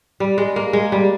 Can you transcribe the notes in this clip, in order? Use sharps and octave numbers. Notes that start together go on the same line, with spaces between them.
G3
G#3
A#3
G#3
G3